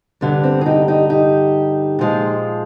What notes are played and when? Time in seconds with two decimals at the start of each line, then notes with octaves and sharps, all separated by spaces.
0.21 G2 D3 G3
0.43 C4
0.61 G#4
0.66 D#4 G4
0.88 D#4 G4
1.10 D#4 G4
1.99 A#2 F3 G#3